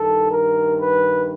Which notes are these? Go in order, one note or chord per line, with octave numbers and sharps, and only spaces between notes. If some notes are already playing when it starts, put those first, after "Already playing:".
Already playing: G2 D#3 A4
A#4
B4